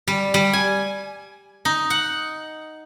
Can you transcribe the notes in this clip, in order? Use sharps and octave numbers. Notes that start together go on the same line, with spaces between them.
G3
G3
G#5
D#4
F#5